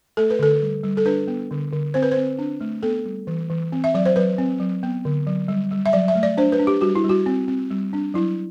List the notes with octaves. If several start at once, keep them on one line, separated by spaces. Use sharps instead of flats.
A3 A4
B4
D3 A4
G3
G3
A4
D4 B4
B3
D3
D3
C4 C5
B4
C5
C4
D4
A3
B3 A4
G3
E3
E3
C4
E5
F#3 D5
C5
F#3 B4
C4
F#3
B3
D3
F#3
G3
G3
E5
F#3 D5
E5
A3
D5
D4 C5
B4
D4
G4
G3 F#4
E4
G3
F#4
C4
C4
G3
D4
F#3 E4